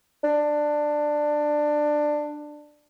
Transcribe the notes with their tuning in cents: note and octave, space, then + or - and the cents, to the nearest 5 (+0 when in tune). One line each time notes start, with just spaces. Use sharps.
D4 +15